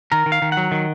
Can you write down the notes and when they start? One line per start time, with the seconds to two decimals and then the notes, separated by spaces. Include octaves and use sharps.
0.12 D#3 A#4
0.26 D#3
0.32 F5
0.42 D#3
0.52 F#3 F#5
0.72 D#3